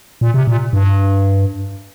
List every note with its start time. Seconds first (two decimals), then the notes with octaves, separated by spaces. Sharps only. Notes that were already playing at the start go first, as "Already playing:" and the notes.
0.21 A#2
0.34 C3
0.47 A#2
0.73 G2